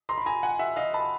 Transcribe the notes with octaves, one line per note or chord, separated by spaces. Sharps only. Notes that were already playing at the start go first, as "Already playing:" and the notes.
A#5 C6
B5
G#5 A#5
F#5 G#5
E5 F#5
D#5 F5
A5 B5